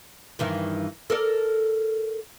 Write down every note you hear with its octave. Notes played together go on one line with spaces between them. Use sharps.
G2 D#3 E3
A4 A#4 D5